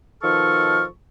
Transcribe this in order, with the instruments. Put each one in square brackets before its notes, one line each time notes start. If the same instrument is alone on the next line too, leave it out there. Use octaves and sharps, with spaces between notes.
[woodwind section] B2 D#3 F3 A4 C#6 F6